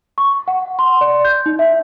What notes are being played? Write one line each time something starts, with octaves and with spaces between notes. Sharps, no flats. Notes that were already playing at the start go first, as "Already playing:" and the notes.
C#6
F#5
C6
D5
G6
D#4
E5